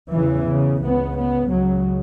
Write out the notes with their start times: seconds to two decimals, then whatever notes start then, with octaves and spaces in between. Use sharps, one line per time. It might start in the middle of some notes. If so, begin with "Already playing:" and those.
0.11 E2 C#3 E3
0.47 C#3
0.81 C#2 C#3 B3
1.16 B3
1.50 C#2 C#3 F#3